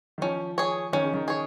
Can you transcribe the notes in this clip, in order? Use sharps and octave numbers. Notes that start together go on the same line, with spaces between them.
D#3
F3 C#4
G#4 C#5
D#3 C#4
C#3
D#3
G#4 C#5